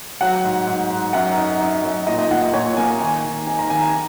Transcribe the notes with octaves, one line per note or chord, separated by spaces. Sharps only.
F#3 F#5
G#2
G#2
G#2
F#2 F#5
D#4
D#4
F#2
A#2 D#5
D#5
A#2 F#5
D#5
A#2 C#5
A#3 G#5
D#3 G#5
D#3
D#4 G#5
A#5
D#3 G#5
G#5